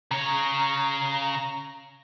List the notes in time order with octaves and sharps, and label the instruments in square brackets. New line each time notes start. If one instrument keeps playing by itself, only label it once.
[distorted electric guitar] C#3 C#5 [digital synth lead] A#5